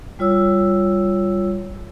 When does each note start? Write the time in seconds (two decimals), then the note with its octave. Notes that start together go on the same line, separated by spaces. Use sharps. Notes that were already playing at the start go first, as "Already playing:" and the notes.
0.19 G3 F4 C#5 E6